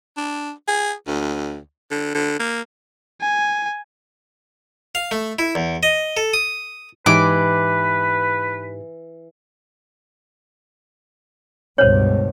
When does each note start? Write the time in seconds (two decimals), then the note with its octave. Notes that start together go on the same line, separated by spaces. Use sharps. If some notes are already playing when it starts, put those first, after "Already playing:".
0.17 D4
0.68 G#4
1.07 D2
1.91 D3
2.15 D3
2.39 A#3
3.21 G#5
4.95 F5
5.11 A3
5.39 E4
5.55 E2
5.83 D#5
6.17 A4
6.33 D#6
7.06 G#2 E3 D#4 G4 B4 D6
11.78 C#2 G2 B2 C5 C#5